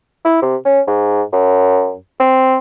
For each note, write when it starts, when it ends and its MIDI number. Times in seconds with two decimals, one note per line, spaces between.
0.25 0.41 64
0.42 0.56 48
0.65 0.80 61
0.87 1.23 44
1.33 1.94 42
2.20 2.57 60